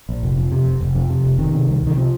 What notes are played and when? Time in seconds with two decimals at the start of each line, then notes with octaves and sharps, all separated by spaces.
0.09 A#1
0.23 F1
0.37 F2
0.52 C3
0.66 F1
0.81 F1
0.95 F2
1.10 C3
1.24 F1
1.39 C3 D#3
1.53 C3
1.68 C2
1.82 C2 D#3
1.96 C3 F3